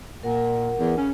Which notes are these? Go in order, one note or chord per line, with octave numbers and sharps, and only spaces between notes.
A#2 A#4 F#5
E2
C#3 C#4